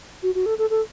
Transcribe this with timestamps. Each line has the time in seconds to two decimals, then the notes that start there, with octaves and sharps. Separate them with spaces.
0.23 F#4
0.35 F#4
0.46 A4
0.58 A4
0.70 A4